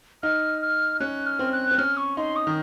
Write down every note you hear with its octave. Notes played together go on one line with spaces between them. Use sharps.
D#4 F6
F6
C#4 F#6
F6
C4
F#6
C4
C#4 F6
C#6
D#4 C6
D#6
D#3